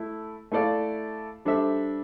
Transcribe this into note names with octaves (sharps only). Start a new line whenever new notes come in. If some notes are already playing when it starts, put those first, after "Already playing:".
Already playing: A3 E4
A3 E4 A4 D5 F5
G3 D4 A4 C5 E5